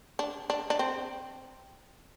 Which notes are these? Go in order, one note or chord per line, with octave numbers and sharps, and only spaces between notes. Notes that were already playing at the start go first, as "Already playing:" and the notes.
D4
D4
D4
C4